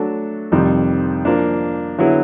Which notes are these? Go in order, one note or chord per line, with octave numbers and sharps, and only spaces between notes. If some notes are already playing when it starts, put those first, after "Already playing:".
Already playing: F#3 A3 D4 F#4 A4
F2 C3 D#3 G3
F3 A#3 D4
D3 F#3 B3 E4 G#4